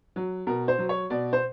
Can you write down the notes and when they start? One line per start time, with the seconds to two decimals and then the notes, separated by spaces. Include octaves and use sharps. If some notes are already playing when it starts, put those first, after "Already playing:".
0.16 F#3
0.47 B2 A#4
0.68 C5
0.78 F#3
0.89 C#5
1.10 B2 D5
1.33 C5